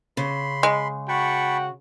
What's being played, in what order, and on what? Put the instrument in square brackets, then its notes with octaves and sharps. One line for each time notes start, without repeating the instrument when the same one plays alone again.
[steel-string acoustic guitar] C#3 [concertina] B5 C6
[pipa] G#3
[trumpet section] F#4 F#5 G5 [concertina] A5 B5 C#6